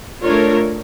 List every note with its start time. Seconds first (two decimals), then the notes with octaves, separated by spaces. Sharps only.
0.22 A3 D4 F4 A#4 C#5